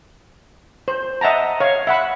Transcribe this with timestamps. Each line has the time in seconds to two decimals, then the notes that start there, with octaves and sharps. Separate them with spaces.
0.88 C5
1.21 D#5 E5 F#5 A5 A#5
1.60 C#5 F5
1.87 E5 F#5 B5